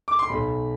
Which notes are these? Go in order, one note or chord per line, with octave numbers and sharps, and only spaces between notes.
D6
C6
B1 B5